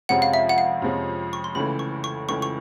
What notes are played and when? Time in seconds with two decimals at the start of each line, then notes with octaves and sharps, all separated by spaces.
0.09 F2 C3 F3 G#3 C#4 F#5
0.22 F5
0.34 E5
0.49 F#5
0.58 F5
0.82 F2 C3 F3 G#3 C#4
1.33 C#6
1.44 C6
1.55 C#2 C#3 E3 A3 B5
1.79 C#6
2.04 C#6
2.29 C#2 C#3 E3 A3 C#6
2.42 C#6